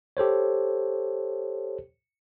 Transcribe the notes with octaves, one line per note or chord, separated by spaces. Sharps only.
G4 A4 C5 C#5